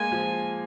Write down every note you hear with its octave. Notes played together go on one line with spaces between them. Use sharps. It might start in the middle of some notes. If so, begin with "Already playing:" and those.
Already playing: G#3 A#3 G#5
F3